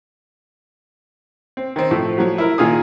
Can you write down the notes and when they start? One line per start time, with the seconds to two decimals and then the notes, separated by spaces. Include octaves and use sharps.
1.57 C4
1.76 D#3 C4
1.91 A2 F3 A3
2.18 F3 F#3
2.38 E4 A#4
2.58 A#2 D#3 F4 G#4 D#6